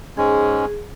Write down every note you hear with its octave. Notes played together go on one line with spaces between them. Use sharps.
G#2 G#3 C#4 G#4